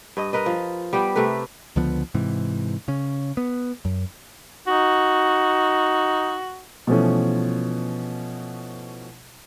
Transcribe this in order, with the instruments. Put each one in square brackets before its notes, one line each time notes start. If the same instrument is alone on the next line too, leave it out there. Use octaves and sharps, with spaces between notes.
[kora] G2 D#5
A#4 B4 D#5
F3
G3 B3 G4 G5
C3 A3 A#4 B4
[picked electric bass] C#2 D3 F3 B3
G#2 C3 E3
C#3 C#4
B3
F#2
[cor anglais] D#4 [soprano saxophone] F#4
[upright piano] B2 E3 F3 A3 C#4